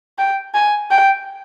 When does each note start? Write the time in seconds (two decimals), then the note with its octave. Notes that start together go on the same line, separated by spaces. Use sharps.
0.18 G5
0.54 G#5
0.91 G5